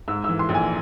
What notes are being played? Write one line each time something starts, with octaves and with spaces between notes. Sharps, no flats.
G#2 E6
E3 E6
C6
A#1
G#5